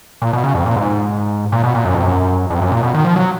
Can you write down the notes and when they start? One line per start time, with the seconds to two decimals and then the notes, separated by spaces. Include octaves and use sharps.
0.22 A#2
0.33 B2
0.44 C#3
0.55 F2
0.66 A#2
0.76 G#2
1.52 A#2
1.63 B2
1.75 A#2
1.85 F#2
1.94 F2
2.03 F#2
2.50 F2
2.61 F#2
2.72 A#2
2.83 B2
2.94 D#3
3.05 F3
3.16 F#3